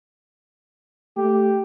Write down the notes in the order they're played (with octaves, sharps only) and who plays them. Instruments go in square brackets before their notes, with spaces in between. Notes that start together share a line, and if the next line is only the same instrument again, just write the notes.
[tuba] A3 [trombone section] G4